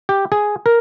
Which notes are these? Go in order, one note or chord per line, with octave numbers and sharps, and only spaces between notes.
G4
G#4
A#4